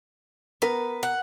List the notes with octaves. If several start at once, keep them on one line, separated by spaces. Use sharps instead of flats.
B3 A#4 B4
F#5